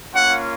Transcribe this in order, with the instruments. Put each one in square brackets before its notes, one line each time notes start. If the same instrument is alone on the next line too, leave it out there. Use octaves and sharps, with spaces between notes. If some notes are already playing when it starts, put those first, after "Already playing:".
[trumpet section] A#3 C#4 F4 F#5